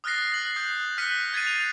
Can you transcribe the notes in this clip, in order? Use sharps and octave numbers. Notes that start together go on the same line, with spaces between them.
D#6 F6 F#6 A6 A#6 C7
F#6 F#7
D#6 G6 C7
F6 F#6 B6 C#7 D#7 F#7
F#6 G#6 A6 B6 C7 D#7
A6 F7